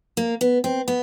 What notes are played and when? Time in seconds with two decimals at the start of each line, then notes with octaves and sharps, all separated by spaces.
0.17 A#3
0.41 B3
0.64 C4
0.88 B3